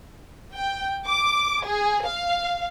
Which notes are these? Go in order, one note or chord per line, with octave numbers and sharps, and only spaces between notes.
G5
D6
G#4
F5